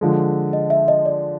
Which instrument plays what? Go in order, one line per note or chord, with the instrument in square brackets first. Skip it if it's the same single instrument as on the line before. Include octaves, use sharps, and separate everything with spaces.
[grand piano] D3 F3 G#3
[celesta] D#5
E5
D#5
D5